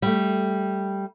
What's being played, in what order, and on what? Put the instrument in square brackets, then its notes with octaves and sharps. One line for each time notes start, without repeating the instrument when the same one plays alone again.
[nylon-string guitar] G3 A3